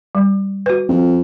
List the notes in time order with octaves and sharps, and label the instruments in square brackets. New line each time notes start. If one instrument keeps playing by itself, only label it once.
[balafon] G3
F#4 B4
[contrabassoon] F2